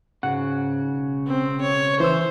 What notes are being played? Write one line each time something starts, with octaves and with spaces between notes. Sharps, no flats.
G#2 C#3 F#4 F#5
E1
C4
C#5
F#1 E3 C5 E6